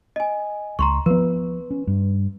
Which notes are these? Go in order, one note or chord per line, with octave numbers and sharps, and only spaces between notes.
D#5 G#5
C#2 A#5 C6 C#6
F3 B3 B4
C#4
G2